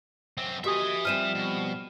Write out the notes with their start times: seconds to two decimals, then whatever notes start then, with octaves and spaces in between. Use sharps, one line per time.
0.38 F#2 C4
0.64 D#3 A#3 F#4 G4 E5 G#5 D#6
1.05 F3 G3 C4 F6 D#7 E7
1.35 B2